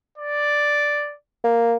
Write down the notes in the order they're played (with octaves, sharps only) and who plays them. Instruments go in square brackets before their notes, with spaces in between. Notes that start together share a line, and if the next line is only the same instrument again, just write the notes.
[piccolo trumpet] D5
[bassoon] A#3